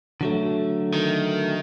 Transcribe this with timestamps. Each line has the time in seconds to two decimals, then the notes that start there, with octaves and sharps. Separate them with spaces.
0.21 D3 F#3 A3
0.94 D#3